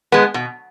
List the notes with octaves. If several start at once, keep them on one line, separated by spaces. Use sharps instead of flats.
G#3 B3
B2